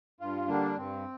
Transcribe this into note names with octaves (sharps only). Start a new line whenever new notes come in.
G2 F4
D3 G3 A#3 D4
G2 C4